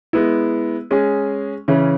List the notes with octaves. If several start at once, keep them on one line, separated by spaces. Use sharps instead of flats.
G#3 B3 E4
G#3 C#4 G#4
C#3 E3 C#4